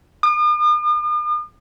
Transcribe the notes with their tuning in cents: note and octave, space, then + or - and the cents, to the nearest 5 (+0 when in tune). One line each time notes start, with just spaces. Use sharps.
D#6 -45